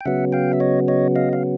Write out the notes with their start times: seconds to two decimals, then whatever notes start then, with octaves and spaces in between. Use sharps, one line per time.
0.01 G5
0.05 C#3 F#3 B3 E5 F#5
0.33 F5 G5
0.53 E5
0.60 C#5 D#5
0.88 C#5 D#5
1.16 D#5 F5
1.33 F5